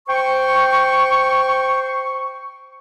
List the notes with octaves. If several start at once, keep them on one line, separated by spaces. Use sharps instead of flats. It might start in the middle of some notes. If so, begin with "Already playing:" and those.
C5 G5 C#6